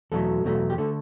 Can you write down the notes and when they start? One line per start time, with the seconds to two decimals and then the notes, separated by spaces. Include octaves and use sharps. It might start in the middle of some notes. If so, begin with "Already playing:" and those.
0.12 E2 B2 F#3 A3 A4
0.44 E2 B2 F#3 A3
0.70 G4
0.78 D3 A3 A4